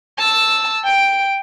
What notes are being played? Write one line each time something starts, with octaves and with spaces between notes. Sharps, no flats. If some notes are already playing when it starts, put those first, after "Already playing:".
A5 E6
G5 D7